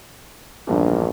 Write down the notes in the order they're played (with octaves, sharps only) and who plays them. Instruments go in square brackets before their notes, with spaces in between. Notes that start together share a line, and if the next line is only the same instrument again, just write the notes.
[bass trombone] A#1 [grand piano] E2 G2 D#3